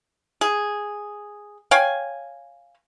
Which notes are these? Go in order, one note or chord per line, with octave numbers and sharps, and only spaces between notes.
G#4
C#5 F5 G5 G#5